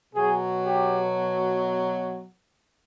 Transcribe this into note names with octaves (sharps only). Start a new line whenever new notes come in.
B2 F#3 G#4
G4